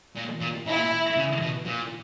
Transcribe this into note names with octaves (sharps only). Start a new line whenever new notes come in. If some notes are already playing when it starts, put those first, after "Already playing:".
A#2
A#2
A#2 E4
C#3
B2
A#2